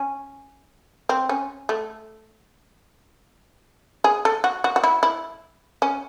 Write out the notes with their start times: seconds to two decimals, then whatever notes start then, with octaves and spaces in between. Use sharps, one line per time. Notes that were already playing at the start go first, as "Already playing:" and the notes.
Already playing: C#4
1.09 C4
1.29 C#4
1.69 A3
4.04 G#4
4.25 A4
4.44 F#4
4.64 F#4
4.76 F#4
4.84 E4
5.03 E4
5.82 C#4